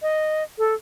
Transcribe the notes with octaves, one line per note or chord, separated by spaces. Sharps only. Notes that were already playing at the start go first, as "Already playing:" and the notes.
D#5
A4